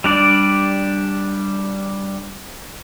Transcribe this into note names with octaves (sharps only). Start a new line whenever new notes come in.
G3 D4 D5